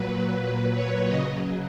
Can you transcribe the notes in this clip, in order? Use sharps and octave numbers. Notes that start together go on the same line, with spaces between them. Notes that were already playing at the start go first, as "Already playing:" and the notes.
Already playing: A#2 F#3 B4
A#2 F#3 B4
C#5
C#3 F#3 D#5